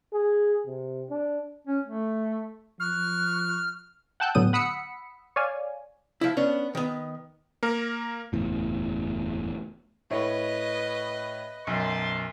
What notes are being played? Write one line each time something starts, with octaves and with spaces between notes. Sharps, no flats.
G#4
C3
D4
C#4
A3
F3 C#6 F6 F#6
F#5 G5 A5 E6 F#6 G6
A2 D3 F#3 B3 D#6 D#7
F#5 B5 D#6 E6 B6 C#7
C#5 D5 F5 G#5
F3 E4
B3 C#4 D4
D#3 B3
A#3 A#4
F#1 E2 A2
A2 B4 C#5 D#5
B1 F#2 G3 A5 C6